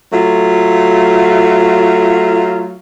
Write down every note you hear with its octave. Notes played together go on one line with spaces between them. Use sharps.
F#3 A3 F4